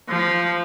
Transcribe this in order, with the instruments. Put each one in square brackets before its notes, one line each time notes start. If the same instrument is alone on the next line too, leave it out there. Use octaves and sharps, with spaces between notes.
[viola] F3